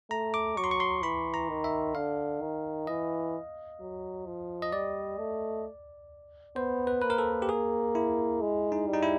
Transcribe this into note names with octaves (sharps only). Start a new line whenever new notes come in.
A3 A#5
D6
F#3 C#6
C6
C#6
C6
E3 B5
A#5
D#3
E5
D3 F5
D#3
E3 D#5
F#3
F3
D#5
G3 D5
A3
B3 C5
B4
A#3 B4
A#4
A4
G4
G#4
E4
G#3
D#4
G3
D#4
E4